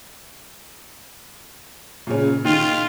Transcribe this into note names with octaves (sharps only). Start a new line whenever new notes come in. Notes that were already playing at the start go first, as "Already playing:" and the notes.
A#2 C#3 C#4
D#3 F4